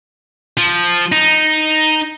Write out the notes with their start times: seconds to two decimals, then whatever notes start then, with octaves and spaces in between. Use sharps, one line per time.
0.58 F3
1.12 D#4